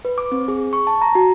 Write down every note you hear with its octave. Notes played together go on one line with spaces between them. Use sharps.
B4
D6
C4
G#4
C#6
A5
A#5
F#4